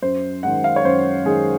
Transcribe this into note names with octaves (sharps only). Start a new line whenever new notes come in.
F#2 C5
D#3 G#3 F#5
F5
C#5
F#2 C5
D#3 G#3 G#4